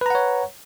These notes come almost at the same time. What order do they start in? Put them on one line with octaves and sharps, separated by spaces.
B4 A#5 F#5 C#5